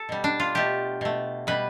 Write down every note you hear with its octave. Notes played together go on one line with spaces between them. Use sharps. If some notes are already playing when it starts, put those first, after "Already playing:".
Already playing: A4
B2 G3
D4
F4
B2 A3 G4
B2 A3
B2 G3 B4